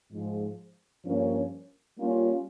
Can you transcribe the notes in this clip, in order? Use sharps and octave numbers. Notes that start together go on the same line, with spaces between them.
G#2 F3 G#3
G2 F3 A#3 C#4
G3 A#3 C#4 F4